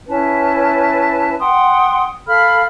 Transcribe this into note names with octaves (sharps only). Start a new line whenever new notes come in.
C#4 E4 B4 A5
F#5 G5 C6 D#6
A4 F5 B5 F6